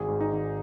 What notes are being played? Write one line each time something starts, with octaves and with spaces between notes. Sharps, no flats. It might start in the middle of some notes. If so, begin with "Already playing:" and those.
Already playing: G#1 G#4
G#2
D#4
G#1